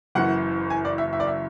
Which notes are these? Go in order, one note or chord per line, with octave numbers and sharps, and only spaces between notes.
F#1 F#2 E3 F#5
G#5
D5
E5
E5
D5
E5